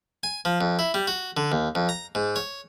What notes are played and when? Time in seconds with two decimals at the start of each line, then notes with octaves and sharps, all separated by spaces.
0.23 G#5
0.45 F3
0.61 F2
0.79 E4
0.94 G3
1.07 F#4
1.37 D3
1.52 D#2
1.75 F2
1.89 A#5
2.15 G#2
2.36 C#5